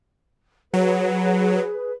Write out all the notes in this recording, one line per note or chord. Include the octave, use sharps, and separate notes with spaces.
F#3 G#4 B4